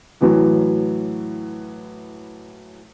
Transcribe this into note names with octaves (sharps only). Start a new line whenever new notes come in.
A2 E3 F#3